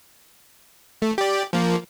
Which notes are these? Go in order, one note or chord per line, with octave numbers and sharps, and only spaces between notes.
A3
G4 D5
F3 A#3